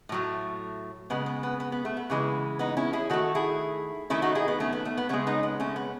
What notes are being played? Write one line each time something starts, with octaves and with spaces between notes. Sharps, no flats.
A2 F#3 A3
C#3 G#3 B3
B3
B3
B3
B3
A3
B3
C#3 E3 G#3
B3 D#4
C#4 E4
E4 G#4
D#3 A3 F#4 A4
E4 G#4
D#3 A3 C#4 E4
D#4 F#4
E4 G#4
B3
A3 C#4
B3
A3
B3
C#3 G#3 A3 C#4
B3 D#4
B3
A3 C#4
B3